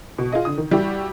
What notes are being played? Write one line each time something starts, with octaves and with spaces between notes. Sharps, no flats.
B2
F4 G#4 D#5
D3 D#6
D#3
G3 E4 F#4 G4